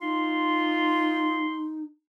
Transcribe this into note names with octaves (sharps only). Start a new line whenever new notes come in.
D#4 F4 C6